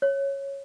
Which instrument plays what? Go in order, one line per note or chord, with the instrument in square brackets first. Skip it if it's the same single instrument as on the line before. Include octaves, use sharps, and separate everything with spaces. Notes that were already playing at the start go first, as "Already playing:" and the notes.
[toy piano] C#5